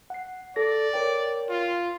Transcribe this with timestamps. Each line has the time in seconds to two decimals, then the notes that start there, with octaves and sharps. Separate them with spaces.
0.10 F#5 C7
0.56 A4 D5 A#6
0.94 A#4 C#5 G5
1.49 F4